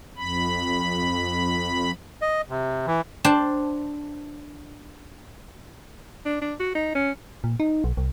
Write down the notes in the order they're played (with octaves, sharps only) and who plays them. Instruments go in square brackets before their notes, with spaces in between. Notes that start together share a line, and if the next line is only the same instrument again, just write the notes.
[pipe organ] F2 B5
[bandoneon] D#5
C3
E3
[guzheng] D4 C5 G5 A5
[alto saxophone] D4
D4
F#4
D#4
C#4
[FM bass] A#2
D#4
B1
C2